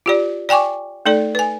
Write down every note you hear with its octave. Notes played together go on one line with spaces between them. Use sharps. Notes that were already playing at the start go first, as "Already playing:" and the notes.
F4 G4 D5
D5 G5 G#5 C#6 D6
A3 D#4 A4 D5
B4 G#5